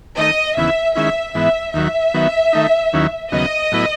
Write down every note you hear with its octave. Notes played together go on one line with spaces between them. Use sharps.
D#3 A3 D#4 D#5
D#2 C#3 E3 B3 E4 E5
D#3 G#3 C#4 E4 E5
G#2 E3 B3 E5
D#2 D#3 F#3 E5
D#3 F#3 B3
D#3 A3 D#4
D#2 D#3 F#3 C#4 E4
D#2 C#3 F#3 B3 D#5
A2 F#3 B3 E4